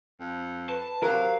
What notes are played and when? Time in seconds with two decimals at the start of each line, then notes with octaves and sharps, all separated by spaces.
0.20 F2
0.69 B4 A5
1.03 C3 F#3 A#4 F5